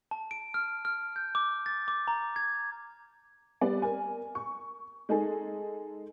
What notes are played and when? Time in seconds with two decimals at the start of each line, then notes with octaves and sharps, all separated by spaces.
0.11 A5
0.31 D7
0.54 F6
0.85 F6
1.16 G6
1.35 D6
1.66 A6
1.88 D6
2.08 A#5
2.36 G#6
3.61 G3 B3 D5
3.82 A#4 G#5
4.35 C#6
5.09 G#3 D#4 G#4 A4